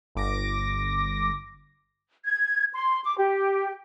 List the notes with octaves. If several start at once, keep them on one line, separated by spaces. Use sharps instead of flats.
G1 D6 A#6
G#6
C6
D6
G4